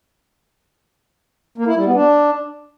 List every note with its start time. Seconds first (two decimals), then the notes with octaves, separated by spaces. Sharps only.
1.58 A#3
1.67 E4
1.76 G3
1.86 B3
1.95 D4